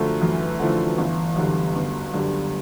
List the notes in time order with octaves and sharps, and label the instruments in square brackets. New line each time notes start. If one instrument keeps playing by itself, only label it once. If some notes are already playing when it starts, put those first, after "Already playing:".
Already playing: [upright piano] F#2 D3 F3 A3
[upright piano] F#2 [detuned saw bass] E3
[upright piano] D3 F3 A3
G1
F#2 D3 G3
G1
F#2 D3 G3